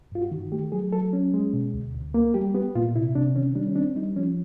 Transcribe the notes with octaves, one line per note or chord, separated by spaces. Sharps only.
G2 F4
F#4
D#3
A3 G4
F#3 G#4
F#3 A4
C#4
G#3
B2
D2
D2
A#3
G3 G4
B3 G4
A#2 F4
C3 E4
C3 D4
D#3 C#4
G3 D4
C#4
C4 D4
G3 D#4
F3 C#4